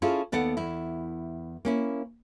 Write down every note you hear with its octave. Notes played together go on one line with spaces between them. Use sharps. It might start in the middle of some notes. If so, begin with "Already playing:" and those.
C#4 E4 F4 G#4 A4
D#2 B3 A4 D5 F#5
E2 E4
A#3 C#4 E4